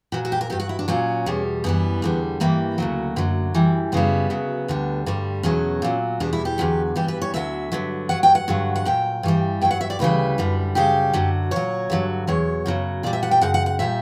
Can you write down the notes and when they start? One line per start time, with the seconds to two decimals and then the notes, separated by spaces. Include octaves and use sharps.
0.12 A#2 F#3 F#4
0.25 F#4
0.32 G4
0.41 A#4
0.50 G2 F#3 G4
0.60 F#4
0.69 E4
0.79 D4
0.88 A#2 F#3 C#4
1.26 E2 B2 G3
1.64 F#2 E3 G3 B3
2.02 E2 D3 G3
2.40 G2 E3 G3 A#3
2.78 D2 C#3 F#3
3.16 F#2 D3 F#3
3.54 F#2 E3 G3
3.92 F#2 C#3 G3 B3
4.30 D2 C#3 F#3
4.68 D2 D3 G3
5.06 G2 D3 G3
5.43 E2 B2 F#3 C#4
5.82 A#2 F#3
6.20 E2 B2 G3 D4
6.33 E4
6.45 G4
6.58 E2 D3 F#3
6.96 G2 E3 G3 G4
7.08 B4
7.22 C#5
7.34 D2 D3 F#3 E5
7.72 G2 D3 F#3
8.09 G2 F#3 F#5
8.23 G5
8.35 F#5
8.48 G2 D3 F#3
8.76 F#5
8.85 A#2 F#3 G5
9.23 G2 E3 G3
9.61 G2 G5
9.65 F#3
9.71 F#5
9.81 E5
9.90 D5
9.99 D2 C#3 E3 G3 B4
10.38 F#2 D3 G3
10.75 F#2 C#3 G3 G4
11.13 F#2 D3 F#3
11.51 A#2 F#3 C#5
11.90 G2 D3 F#3
12.27 E2 B2 F#3 C#5
12.66 F#2 C#3 F#3
13.03 A#2 G3 D5
13.13 E5
13.23 F#5
13.31 G5
13.41 F#2 C#3 F#5
13.54 F#5
13.66 F#5
13.79 A#2 G3 E5